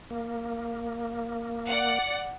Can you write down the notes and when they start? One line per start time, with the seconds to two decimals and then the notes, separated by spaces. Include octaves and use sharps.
0.10 A#3
1.67 D5 F#5